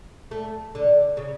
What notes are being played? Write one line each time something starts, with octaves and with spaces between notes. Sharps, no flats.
A3
D3
C#3